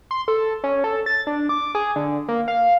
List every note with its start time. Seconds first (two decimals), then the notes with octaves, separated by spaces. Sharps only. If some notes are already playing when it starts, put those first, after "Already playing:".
0.11 C6
0.28 A4
0.64 C#4
0.84 A4
1.06 A6
1.27 D4
1.49 D6
1.75 G#4
1.96 D3
2.28 A#3
2.48 F5